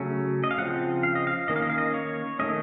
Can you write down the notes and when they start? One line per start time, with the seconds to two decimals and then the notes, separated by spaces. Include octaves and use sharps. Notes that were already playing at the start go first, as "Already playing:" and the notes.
Already playing: C#3 F#3 A3 C#4
0.44 D#5
0.51 F5
0.58 C#3 F3 C4 F#5
1.03 F5
1.15 D#5
1.27 F5
1.48 D#3 A#3 C#4 D#5
1.56 F5
1.62 D#5
1.70 F5
1.78 D#5
1.94 C#5
2.39 D#3 A3 C#4 D#5